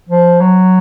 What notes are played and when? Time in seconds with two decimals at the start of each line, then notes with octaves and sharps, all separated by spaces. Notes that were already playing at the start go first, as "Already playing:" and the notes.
0.09 F3
0.41 F#3